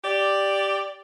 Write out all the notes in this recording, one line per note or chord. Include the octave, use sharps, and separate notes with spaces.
G4 D5